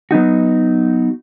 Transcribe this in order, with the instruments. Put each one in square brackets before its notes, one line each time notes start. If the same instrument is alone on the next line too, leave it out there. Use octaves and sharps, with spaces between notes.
[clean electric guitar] F#3 B3 D#4 F#4